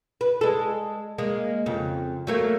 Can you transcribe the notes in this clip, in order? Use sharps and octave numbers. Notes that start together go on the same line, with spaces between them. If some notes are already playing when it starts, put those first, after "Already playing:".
B4
G#3 A4
G#3 A#3
F2 C#3
F#3 A3 A#3